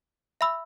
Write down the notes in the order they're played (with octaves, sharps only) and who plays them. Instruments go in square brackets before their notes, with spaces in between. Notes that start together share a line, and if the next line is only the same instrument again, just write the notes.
[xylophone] E5 B5 E6